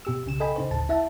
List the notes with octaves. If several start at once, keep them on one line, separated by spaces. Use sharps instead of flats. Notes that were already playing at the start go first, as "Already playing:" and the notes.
B2 G4 E6
C2 C#3 E7
A4 D#5 G5 G#5 B5
C#3 D#4 C5
A1 D2 A5
E4 E5 F#5 A5